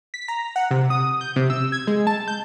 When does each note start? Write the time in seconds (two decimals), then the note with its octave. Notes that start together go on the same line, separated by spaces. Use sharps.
0.14 B6
0.28 A#5
0.56 F#5
0.71 C3
0.90 D#6
1.21 G6
1.36 C3
1.50 E6
1.72 G#6
1.87 G#3
2.07 A5
2.28 G6